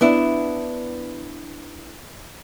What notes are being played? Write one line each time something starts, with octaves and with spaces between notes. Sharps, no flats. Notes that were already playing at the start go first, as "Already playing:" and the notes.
B3 D4 E4